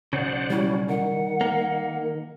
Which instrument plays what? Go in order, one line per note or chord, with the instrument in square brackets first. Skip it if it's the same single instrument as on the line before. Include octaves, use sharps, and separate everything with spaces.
[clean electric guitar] B1 C#3 [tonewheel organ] C5 D5 F#5
[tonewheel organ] F#3 C#4 [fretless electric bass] G3 [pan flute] E4
[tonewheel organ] D#3 [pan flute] F#5
[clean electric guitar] A#3